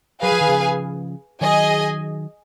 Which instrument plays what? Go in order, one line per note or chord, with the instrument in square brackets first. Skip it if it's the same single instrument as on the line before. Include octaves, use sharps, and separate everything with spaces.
[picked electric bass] F#3 [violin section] G#4 B4 F5 G#5
[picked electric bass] F3
D#3
C#3 F3
[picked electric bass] D#3 F#3 [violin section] G#4 D#5 G#5